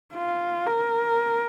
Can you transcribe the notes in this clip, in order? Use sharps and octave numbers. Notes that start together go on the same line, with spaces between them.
F4
A#4